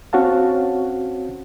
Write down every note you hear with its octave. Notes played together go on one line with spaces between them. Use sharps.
C4 C#4 F#4 C#5 F5 A5